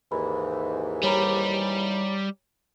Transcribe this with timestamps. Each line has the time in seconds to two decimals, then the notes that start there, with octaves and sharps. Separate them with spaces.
0.12 D#2 G#2 E3 B5
1.04 G3 C#5 A#5 B5